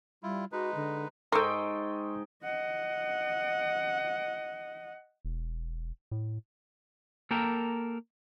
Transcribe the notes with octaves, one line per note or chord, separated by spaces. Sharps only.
G3 E4 F4
G#3 D#4 F#4 B4
D3
G#2 A4 A#4 D#5 G5 C6 C#6 E6
D#5 F#5
E1
A2
A#3 A4 A#4 G5